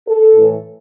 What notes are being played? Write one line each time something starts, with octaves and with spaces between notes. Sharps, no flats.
A4
A2 E3